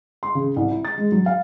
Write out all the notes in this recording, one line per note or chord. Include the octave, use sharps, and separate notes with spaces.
C6
C#3
C2
E4
A6
G#3
F#3
F5